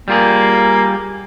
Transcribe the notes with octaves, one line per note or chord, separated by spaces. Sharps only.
G3 A#3 F4 G#4